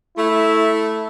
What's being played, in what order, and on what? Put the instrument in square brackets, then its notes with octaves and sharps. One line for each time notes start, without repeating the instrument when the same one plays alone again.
[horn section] A3 [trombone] E4